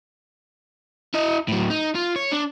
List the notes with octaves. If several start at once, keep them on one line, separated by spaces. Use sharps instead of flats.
E4 D#5
A2 F#3
D#4
F4
C#5
D4